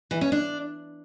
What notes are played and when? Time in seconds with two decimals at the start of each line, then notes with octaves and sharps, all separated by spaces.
0.11 E3
0.21 C#4
0.32 D4